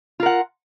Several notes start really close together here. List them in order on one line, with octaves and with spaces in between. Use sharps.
F4 A#4 F#5